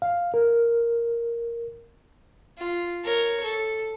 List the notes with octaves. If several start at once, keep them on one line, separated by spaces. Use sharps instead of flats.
F5
A#4
F4
A#4 C#5
A4